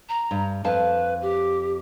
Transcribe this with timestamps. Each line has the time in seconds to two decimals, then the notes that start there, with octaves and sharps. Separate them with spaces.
0.09 A#5
0.31 G2
0.64 F2 B4 F5 A5
1.22 G4